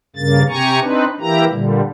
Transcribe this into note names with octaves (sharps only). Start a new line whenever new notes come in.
G2 C#3 A#3 A6
C3 G4 G#5 A#5 C#6
C4 D4 D#4 B4
E3 A#3 E4 G4 A#5
A#2 D3 G3